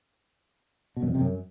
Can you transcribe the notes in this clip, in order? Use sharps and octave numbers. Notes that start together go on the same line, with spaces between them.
B2
F#2
F2
C3
F#2